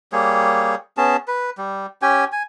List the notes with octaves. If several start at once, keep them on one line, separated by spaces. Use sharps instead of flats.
G3 A#3 G#4 C#5
B3 C#4 G#4 A5
B4
G3
C#4 G4 G5 G#5
G#5